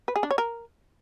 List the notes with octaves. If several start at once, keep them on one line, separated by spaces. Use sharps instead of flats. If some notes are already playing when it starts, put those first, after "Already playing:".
B4
G#4
D4
C#5
A#4